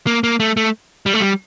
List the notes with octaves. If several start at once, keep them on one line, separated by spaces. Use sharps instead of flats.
A#3
A#3
A3
A3
G3
A3
G3